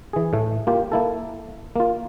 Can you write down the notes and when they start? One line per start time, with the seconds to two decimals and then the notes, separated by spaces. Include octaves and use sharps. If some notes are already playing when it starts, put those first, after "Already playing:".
0.13 E3 G#4
0.33 A2 A3
0.67 A#3 F4 G4
0.92 A#3 E4 A4
1.76 A#3 F4